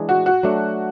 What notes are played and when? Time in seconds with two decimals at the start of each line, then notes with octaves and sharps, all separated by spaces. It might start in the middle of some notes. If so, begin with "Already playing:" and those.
Already playing: E3 G#3 D4 G#4
0.09 F#4
0.26 F#4
0.43 F#3 A3 D4